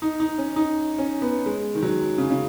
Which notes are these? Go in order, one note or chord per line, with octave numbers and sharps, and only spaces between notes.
D#4
D#4
C#4
D#4
C#4
B3
G#3
D#3
F#3
C#3
C#3